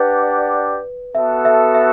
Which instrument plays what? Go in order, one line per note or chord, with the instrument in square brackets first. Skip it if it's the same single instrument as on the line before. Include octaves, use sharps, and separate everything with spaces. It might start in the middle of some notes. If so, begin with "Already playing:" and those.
Already playing: [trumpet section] D4 G4 D5 F#5 [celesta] B4
[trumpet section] B3 F#4 A4 [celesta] E5
[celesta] E5
E5